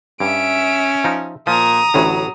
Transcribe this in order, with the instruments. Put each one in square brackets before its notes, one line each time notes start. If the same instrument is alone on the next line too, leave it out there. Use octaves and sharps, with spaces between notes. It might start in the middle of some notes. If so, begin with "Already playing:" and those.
[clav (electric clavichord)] G2 [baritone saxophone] C#4 [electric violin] E5 D7
[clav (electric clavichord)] F3 D#4
[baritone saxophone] A#2 [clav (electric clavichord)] F3 [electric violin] A#5 D#6
[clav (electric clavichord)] A1 D2 A2 [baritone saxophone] F#3